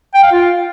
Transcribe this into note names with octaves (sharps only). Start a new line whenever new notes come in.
G5
F5
F4